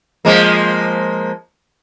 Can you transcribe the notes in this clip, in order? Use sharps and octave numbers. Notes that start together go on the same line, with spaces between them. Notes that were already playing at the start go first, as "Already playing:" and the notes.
F3 G#3 A#3